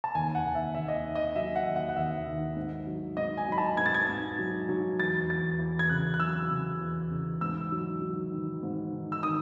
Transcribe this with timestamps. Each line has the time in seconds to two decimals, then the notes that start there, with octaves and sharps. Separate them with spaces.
0.04 A5
0.15 D#2 G#5
0.35 F#5
0.45 D#2
0.55 E5
0.75 D#2 E5
0.88 D#5
1.05 D#3
1.15 D#5
1.36 F#3 E5
1.56 F#5
1.66 D#2
1.76 F#5
1.89 F#5
1.96 D#2 E5
2.27 D#3
2.56 G#2
2.87 F#3
3.17 G#2 D#5
3.37 G#5
3.48 F#3 B5
3.58 A5
3.77 G#2 G#6
3.86 A6
3.94 G#6
4.09 G#2
4.39 F#3
4.69 F#3
4.99 E2 A6
5.30 E2 A6
5.59 E2
5.79 G#6
5.89 C#3 F#6
6.14 F#6
6.20 F#3 E6
6.50 C#3
6.81 E2
7.11 C#3
7.41 G#2 E6
7.72 F#3
8.02 F#3
8.32 D#3
8.63 G#2
8.93 D#3
9.12 E6
9.23 D#3 D#6